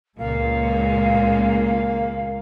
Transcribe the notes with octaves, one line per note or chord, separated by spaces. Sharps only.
C#2 A#2 C#3 G#3 A#3 F5